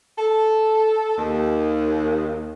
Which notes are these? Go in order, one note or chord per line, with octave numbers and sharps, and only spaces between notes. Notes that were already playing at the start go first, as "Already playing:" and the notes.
A4
D#2